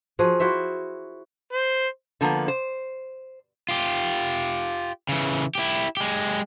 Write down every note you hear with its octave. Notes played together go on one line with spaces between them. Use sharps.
F3 F#4 G#4
E4 F#4 C5 E5
C5
D3 F3 A#3 B3
C5
F4 G4
C#3 E3
E4 G4
G#3 G4